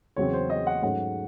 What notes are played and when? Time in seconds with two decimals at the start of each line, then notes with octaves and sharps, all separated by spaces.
0.16 E2 C#3 F#3 C4 C#5
0.33 C5
0.50 D#5
0.67 F#5
0.82 G#2 F#3 A3 C#4 F#5